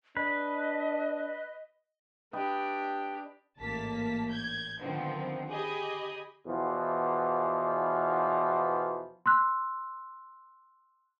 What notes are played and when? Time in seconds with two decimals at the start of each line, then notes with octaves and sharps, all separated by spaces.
0.17 D4 B4 D#5
2.33 D4 G4 B4 D#5 G5
3.59 A1 G#2 A#3 A5 B6
4.30 G6 G#6
4.80 D3 D#3 F3 B3 C4
5.50 G4 G#4 D#5 B5
6.46 E2 B2 E3 F3
9.26 C6 E6 F#6